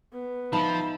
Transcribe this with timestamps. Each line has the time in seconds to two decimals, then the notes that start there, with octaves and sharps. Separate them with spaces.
0.13 B3
0.53 F3 D#4 E5 A5 B5